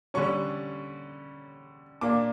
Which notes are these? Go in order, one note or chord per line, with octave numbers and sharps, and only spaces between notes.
D3 G3 C#4 C#6
A#2 A#3 D4 D6